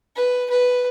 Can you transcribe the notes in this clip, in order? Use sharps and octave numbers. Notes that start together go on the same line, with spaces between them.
B4
B4